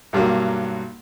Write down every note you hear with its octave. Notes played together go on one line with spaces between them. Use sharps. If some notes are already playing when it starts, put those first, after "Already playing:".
B1 G2 F#3 A#3